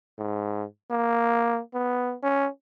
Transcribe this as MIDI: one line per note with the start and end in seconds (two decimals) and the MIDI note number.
0.18 0.65 44
0.91 1.60 58
1.74 2.15 59
2.23 2.49 61